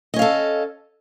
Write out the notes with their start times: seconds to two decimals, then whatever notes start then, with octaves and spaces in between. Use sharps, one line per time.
0.14 D#5
0.16 C#4
0.19 F5
0.22 A4